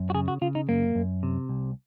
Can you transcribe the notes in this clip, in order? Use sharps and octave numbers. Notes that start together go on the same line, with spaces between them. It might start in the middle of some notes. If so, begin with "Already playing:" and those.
Already playing: F#2
F#4
C#3 G#4
F#4
C#3 F4
D#4
F#2 A#3
F#2
C3
C2